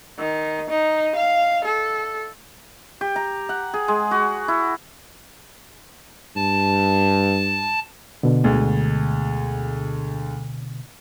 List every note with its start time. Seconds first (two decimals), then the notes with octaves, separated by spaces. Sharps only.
0.18 D#3
0.70 D#4
1.15 F5
1.65 A4
3.01 G4
3.16 A#5
3.49 F#5
3.74 G#4
3.88 G#3
4.11 F#4
4.48 E4
6.36 G2 A5
8.23 B2 D3
8.44 D2 G#3